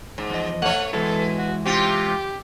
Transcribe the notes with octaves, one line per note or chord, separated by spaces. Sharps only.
G#2
E2 F3 D#5
A3 C#5 F#5
B2 E3 G#3 E4 A4
F#4
C3 F4 G4